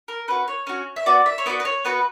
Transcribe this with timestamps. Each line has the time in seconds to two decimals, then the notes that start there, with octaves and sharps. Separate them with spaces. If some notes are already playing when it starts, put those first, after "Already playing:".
0.08 A#4
0.28 C#4 F#4 B4
0.48 C#5
0.67 C#4 F#4
0.96 E5
1.06 B3 F#4 D5
1.26 E5
1.38 C#5
1.46 B3 F#4 D5
1.60 B4
1.65 C#5
1.85 B3 F#4 B4